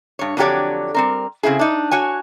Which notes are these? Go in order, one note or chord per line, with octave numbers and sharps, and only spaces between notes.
G2 C#5
F2 D3 F#3 G4 C#5 D5
G3 C4 A#4
C#3 C4 E4 G#4
D4 D#4
F#4 C#5 G#5